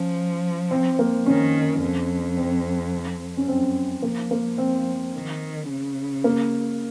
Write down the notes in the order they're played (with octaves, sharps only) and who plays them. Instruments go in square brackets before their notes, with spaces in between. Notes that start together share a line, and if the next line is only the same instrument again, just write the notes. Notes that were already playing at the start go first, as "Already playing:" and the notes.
Already playing: [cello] F3 [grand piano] C#4
[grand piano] C4
A#3
[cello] D#3 [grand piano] C#4
[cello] F2
[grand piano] C4
C#4
[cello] F#2 [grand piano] C4
[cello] F3 [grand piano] A#3
[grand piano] A#3
C4
[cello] D#3
C#3
[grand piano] A#3